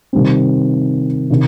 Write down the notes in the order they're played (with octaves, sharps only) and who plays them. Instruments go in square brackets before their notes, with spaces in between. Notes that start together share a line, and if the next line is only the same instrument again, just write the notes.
[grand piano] C3 D#3 G3 C4
C3 D#3